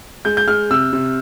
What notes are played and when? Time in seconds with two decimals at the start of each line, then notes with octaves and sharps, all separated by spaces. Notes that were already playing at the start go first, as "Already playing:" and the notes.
0.25 G#3 G6
0.37 G6
0.47 G#3 F6
0.70 C3 E6
0.93 C3